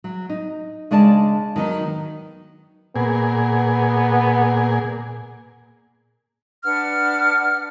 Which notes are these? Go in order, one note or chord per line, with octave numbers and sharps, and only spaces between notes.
F#3
D#4
C#3 G#3 D4 D5 A5
D#3 F#3 B3 D#4
A#2 B3 G#4
D4 B4 F#5 F6